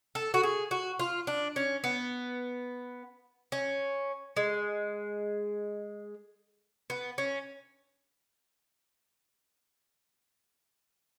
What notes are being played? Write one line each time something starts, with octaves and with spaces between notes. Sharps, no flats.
A4
F#4
G#4
F#4
F4
D4
C#4
B3
C#4
G#3
B3
C#4